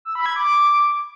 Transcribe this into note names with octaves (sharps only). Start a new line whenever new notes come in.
E6
B5
G#6
D6